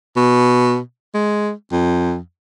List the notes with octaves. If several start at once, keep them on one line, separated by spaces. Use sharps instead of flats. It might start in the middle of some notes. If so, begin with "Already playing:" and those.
B2
G#3
F2